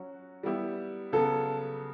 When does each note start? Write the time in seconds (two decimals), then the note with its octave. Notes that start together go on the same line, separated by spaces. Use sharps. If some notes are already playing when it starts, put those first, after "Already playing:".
Already playing: F#3 C#4 F#4
0.43 G3 B3 E4 G4
1.12 C#3 F#3 B3 A4